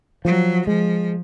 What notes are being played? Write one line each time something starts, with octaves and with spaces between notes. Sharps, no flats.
F3 F#3
F3 G#3